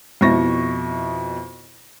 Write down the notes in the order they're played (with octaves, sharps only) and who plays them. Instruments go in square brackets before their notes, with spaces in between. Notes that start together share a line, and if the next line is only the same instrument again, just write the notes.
[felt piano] F2 B2 E4 C#6 A#6